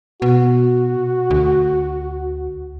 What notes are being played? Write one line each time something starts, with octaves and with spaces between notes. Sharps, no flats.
B2 F#4
D2